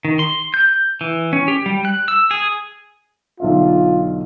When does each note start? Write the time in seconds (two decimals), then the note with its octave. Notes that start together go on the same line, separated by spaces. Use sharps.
0.05 D#3
0.19 C6
0.54 G6
1.01 E3
1.33 C#4
1.48 G4
1.66 G3
1.85 F#6
2.08 E6
2.31 G#4
3.40 B1 D3 F4 E5